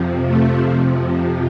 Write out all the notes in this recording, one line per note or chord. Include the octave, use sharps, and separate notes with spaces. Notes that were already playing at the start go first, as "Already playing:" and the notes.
Already playing: F2 C3 F3
A3